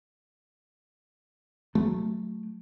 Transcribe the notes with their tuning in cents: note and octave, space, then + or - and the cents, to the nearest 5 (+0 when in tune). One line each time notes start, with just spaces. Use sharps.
F#3 +0 A3 +0